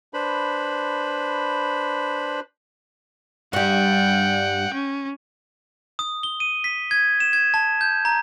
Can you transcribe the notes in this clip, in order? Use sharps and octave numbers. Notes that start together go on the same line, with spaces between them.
D4 B4 C5 B5
G2 G3 F#5 G5
C#4
D#6
G7
D#7
B6
G#6
E7
G#6
A5
G6
A#5